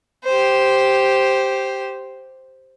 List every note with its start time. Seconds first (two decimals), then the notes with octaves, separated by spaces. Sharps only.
0.24 G4 C5